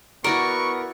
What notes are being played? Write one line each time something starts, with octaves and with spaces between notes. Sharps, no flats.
B3 E4 F#4 A#4 D5 C#6